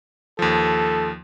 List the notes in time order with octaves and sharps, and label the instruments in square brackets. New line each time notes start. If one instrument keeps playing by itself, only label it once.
[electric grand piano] D#2 F3 [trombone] A4